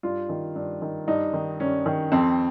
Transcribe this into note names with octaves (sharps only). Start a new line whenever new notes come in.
G2 F4
D#3
G2
D#3
G2 D#4
D#3
G2 C#4
D#3
F2 C4